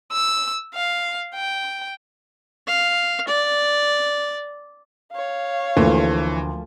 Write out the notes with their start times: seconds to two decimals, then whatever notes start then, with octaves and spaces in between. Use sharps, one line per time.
0.12 E6
0.75 F5
1.35 G5
2.67 F5
3.27 D5
5.12 C#5 F5
5.77 D2 E3 F3 A3 A#3